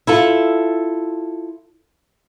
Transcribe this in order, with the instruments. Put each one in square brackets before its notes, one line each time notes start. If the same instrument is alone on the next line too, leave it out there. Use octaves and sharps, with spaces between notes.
[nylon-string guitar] E4 F4 A4